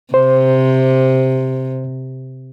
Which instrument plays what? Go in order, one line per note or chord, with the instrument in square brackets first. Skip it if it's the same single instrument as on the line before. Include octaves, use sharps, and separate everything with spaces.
[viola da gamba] C3 [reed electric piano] C5